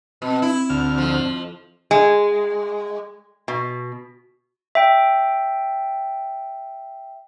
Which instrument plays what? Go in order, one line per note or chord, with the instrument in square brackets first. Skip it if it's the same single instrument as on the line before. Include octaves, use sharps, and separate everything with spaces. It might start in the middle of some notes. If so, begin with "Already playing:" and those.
[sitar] B2 [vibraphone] C4
[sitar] E4
[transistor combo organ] D2 F6
[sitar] F2 F3
[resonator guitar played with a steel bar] G#3
B2
[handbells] E5 G5